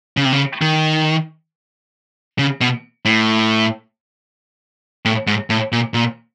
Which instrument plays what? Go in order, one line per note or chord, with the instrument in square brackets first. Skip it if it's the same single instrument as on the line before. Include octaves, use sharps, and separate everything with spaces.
[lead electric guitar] C#3
C3
C#3
D#3
C#3
B2
A2
A2
G#2
A2
A#2
A#2